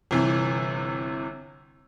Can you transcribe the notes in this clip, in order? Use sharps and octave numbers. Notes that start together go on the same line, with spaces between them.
G1 C3 E3